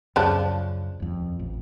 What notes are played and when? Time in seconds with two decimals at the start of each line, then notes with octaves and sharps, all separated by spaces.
0.16 C#2 F#2 C#3 F3 D4
1.00 D#1 F2
1.39 A1